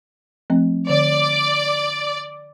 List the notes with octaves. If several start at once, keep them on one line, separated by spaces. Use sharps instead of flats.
F3 A3 C4
D3 D5